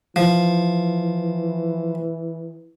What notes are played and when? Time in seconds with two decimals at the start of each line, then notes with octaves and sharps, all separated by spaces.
0.16 E3 F3